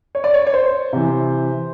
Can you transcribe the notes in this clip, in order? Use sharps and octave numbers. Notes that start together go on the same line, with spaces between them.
C#5
D5
C#5
C#5
C5
C3 E3